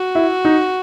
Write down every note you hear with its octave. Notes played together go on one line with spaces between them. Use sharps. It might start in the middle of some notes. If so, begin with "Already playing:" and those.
Already playing: F#4
E4
D#4